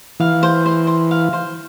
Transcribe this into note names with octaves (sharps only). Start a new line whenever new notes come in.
E3 F5
C5
C5
C5
F5
C5